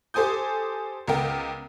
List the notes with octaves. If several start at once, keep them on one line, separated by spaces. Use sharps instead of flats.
G4 A4 C5 G#5 D#6 G6
C#2 B3 A#4 G5